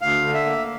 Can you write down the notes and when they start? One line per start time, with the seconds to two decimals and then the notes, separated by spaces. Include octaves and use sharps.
0.01 D2 F5
0.23 D3
0.34 E5
0.45 A#3